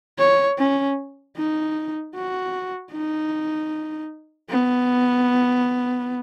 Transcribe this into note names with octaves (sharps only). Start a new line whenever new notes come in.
C#5
C#4
D#4
F#4
D#4
B3